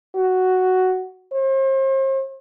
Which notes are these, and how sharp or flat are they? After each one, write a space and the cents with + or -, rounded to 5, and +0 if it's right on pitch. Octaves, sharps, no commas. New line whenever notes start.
F#4 +5
C5 +40